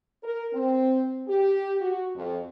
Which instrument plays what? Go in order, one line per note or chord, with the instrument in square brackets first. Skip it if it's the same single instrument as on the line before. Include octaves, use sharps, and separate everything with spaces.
[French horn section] A#4
C4
G4
F#4
F2